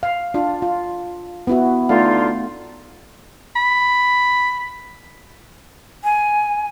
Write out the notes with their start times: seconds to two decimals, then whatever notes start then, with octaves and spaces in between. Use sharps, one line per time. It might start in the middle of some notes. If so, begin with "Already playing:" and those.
0.03 F5
0.34 D4 F4
0.62 F4
1.47 B3 E4 F#4
1.89 D3 A3 D#4 F4 F5
3.56 B5
6.04 G#5